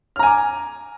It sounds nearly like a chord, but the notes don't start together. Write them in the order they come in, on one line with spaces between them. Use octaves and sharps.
F6 A#5 G#5 D6